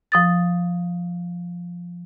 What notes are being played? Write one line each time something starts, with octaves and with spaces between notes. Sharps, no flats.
F3 D#6 A6